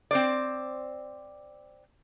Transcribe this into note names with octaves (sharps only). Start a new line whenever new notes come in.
C4 C5 D5